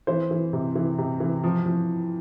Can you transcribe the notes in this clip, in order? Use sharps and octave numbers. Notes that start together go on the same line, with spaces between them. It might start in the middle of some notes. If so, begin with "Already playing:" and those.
E3 C5
E3
C3
E3
C3
E3
F3
F3